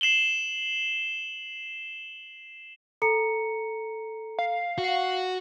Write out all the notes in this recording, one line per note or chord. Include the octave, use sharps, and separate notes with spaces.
C7 E7 F#7 G7
A4 A#5 C#7
F5
F#4